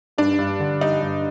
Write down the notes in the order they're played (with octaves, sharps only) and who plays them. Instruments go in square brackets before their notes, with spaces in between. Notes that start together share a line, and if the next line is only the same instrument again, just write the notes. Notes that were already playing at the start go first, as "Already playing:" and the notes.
[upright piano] G2 [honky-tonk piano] D4
[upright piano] G2
D3
[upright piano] G3 [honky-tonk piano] D#4
[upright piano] G2